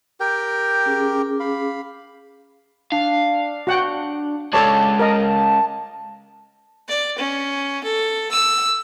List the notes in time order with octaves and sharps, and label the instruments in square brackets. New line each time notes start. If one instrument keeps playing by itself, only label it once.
[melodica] G4 A#4 G5
[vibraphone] C#4 G#4 D6
[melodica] F5 B5
[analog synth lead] D4 [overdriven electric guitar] F5
[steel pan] F#4 F#5 G5
[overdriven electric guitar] G#3 C#4 [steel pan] A4 C#5 D5 [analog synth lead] A5
[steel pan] A#4 D#5
[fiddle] D5
C#4
A4
E6